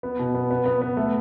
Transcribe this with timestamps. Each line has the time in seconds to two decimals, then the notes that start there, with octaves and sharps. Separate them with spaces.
0.03 B3
0.19 B2
0.34 B3
0.50 B3
0.66 B3
0.81 B3
0.97 A3